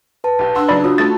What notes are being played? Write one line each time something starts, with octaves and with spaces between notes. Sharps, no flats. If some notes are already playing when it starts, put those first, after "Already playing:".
B4 A5
B1 G4
D4 F#5 C6 E6
C#3 F#3 D#4 D5 B5
F4 F#4 C#5 D#6
A3 C#4 A4 A6